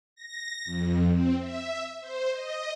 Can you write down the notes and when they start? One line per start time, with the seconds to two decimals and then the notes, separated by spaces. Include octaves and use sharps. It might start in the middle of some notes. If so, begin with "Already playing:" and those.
0.15 A#6
0.65 F2
1.11 C4
1.40 E5
2.00 C5
2.31 D#5